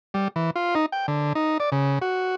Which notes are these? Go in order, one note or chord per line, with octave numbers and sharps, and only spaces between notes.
G3
E3
F4
D#4
G5
D3
D#4
D5
C#3
F#4